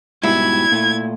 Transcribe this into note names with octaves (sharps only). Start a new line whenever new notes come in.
G#2 B2 G3 E4 G#6
A#2 A3